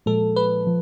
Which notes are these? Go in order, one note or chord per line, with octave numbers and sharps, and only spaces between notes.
A#2 F3 G#3 A4
B4
F3